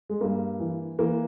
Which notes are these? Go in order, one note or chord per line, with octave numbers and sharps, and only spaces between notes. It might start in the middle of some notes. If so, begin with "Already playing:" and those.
G#3
G2 A#3
E3
E3 A#3